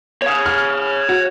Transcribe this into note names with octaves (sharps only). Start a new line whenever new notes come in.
C#5 F5
F6
F#4